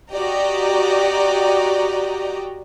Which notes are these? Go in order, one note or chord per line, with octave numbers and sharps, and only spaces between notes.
F#4 G4 D5 D#5 G5 A#5